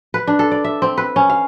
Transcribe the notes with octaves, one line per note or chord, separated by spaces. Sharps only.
B4
D4
A4
D5
E5
C4
B4
C#4
F5